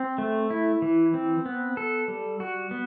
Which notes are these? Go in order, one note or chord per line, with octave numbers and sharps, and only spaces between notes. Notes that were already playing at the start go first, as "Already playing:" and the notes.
Already playing: C4
A3
E4
E3
C4
B3
A4
G3
F#4
B3